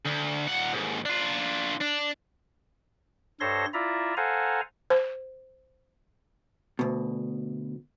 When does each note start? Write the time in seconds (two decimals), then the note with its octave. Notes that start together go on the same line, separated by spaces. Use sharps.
0.05 D2
0.47 A#2 F#5
0.73 D#2 G#2
1.06 D4 F4
1.81 D4
3.40 G2 A4 C5 C#5 C6 A#6
3.74 E4 F4 D5 E5 A#5
4.17 A4 C5 F5 F#5 G#5 A#5
4.90 C5
6.79 D2 B2